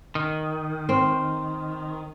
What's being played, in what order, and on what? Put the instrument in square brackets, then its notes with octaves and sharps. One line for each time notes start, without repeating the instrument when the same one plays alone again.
[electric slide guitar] D#3
[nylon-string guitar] C4